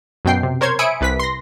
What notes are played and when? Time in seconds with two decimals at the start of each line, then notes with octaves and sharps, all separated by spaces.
0.25 F#2 B2 G5 C7
0.43 C3
0.61 A#4 C5 C#5 C6 G#6
0.79 E5 G#5 B5 D#6 C#7 D7
1.01 C2 B4 B6
1.19 C6 A#6